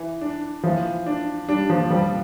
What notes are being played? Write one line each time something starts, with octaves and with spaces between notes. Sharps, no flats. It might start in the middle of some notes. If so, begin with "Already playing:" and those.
Already playing: E3
D4
E3 F3
D4
G3 D4
F3
F3 G3